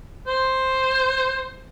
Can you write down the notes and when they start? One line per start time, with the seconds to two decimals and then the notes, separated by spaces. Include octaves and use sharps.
0.27 C5